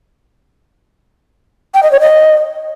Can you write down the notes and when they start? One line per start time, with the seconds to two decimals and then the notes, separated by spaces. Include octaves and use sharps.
1.74 G5
1.83 D#5
1.92 C#5
2.00 D#5